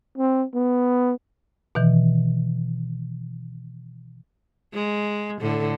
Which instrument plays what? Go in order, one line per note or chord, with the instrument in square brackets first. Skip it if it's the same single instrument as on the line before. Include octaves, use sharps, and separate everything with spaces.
[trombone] C4
B3
[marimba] B2 D#3 E3
[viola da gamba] G#3
A2 D3